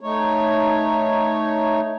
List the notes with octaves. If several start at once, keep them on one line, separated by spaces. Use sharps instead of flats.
A3 D#4 C#5